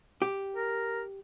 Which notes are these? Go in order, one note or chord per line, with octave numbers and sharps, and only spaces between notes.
G4
A#4